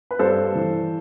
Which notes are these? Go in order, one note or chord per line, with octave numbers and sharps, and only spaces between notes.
B4
G2 A4 C5
E3